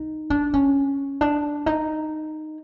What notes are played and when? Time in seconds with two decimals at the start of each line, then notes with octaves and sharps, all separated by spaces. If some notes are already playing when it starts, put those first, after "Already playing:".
Already playing: D#4
0.30 D4
0.54 C#4
1.21 D4
1.66 D#4